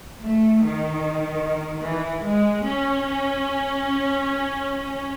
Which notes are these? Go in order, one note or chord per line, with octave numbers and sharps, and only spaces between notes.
A3
D#3
E3
G#3
C#4